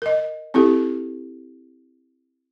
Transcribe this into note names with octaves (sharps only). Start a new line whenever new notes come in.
A#4 D#5
C4 E4 G4 A4